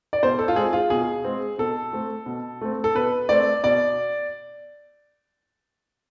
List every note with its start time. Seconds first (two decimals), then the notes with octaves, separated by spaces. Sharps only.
0.13 D5
0.23 B2 C5
0.39 A4
0.48 F4
0.56 G#3 C4 G#4
0.73 F4
0.90 B2 G#4
1.25 G#3 C4
1.58 B2 A4
1.93 A3 C4
2.26 B2
2.61 A3 C4
2.84 A4
2.95 B2 B4
3.29 A3 C4 D5
3.64 B2 D5